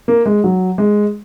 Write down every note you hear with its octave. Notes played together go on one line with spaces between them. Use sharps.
A#3
G#3
F#3
G#3